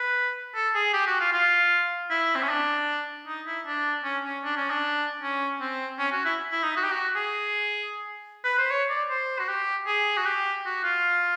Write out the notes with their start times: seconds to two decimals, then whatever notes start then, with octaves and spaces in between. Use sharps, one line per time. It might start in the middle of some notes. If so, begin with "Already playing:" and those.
Already playing: B4
0.55 A4
0.75 G#4
0.93 G4
1.07 F#4
1.20 F4
1.33 F4
2.10 E4
2.35 C4
2.43 C#4
2.49 D4
3.27 D#4
3.47 E4
3.66 D4
4.04 C#4
4.24 C#4
4.44 D4
4.57 C#4
4.70 D4
5.21 C#4
5.60 C4
5.99 C#4
6.12 F#4
6.25 E4
6.51 E4
6.63 D#4
6.76 F#4
6.83 G4
6.91 F#4
7.15 G#4
8.44 B4
8.58 C5
8.70 C#5
8.90 D5
9.10 C5
9.39 F#4
9.48 G4
9.87 G#4
10.17 F#4
10.26 G4
10.66 F#4
10.84 F4